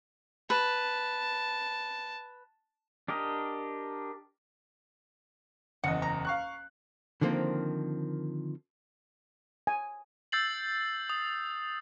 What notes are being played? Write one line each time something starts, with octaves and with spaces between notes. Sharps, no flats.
B4 A5
D4 G4 A#4 D#5
F#1 E2 D#5 F#5
A#5
F5 C#6 F#6
D3 D#3 F3 A#3 C4
G#5
E6 G6 A6 C7 F#7
D#6